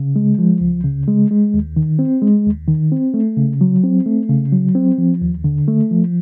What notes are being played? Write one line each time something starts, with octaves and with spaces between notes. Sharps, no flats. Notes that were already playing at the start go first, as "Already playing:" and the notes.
Already playing: C#3
G#3
F3
C#2
C#3
G#3
G#3
D#2
D#3
C4
G#3
D#2
D#3
C4
A3
C#3
F#3
C4
A3
C#3
F#3
C4
F3
D#2
D3
A3
F3